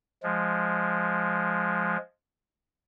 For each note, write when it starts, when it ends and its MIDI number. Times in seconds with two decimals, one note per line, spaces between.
0.23 1.97 53
0.23 1.97 56